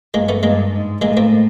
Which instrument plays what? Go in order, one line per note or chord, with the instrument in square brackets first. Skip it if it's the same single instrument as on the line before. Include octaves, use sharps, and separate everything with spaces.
[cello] G2 [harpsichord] G#3 A#3
[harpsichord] A3 B3
[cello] G2 [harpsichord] G#3 A#3
[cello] G#2
[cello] A2 [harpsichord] G#3 A#3
[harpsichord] A#3 C4